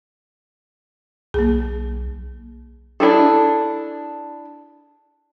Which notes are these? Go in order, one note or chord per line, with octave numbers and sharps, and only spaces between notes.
B1 A#3 G#4
D4 E4 G#4 A4